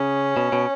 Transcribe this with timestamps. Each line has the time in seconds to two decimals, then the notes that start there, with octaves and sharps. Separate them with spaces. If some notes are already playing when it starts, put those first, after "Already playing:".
Already playing: C#3 C#4
0.37 B2
0.52 B2